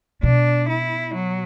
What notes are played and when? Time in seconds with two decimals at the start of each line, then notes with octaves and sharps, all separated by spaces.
0.23 B2 D4
0.69 E4
1.15 F#3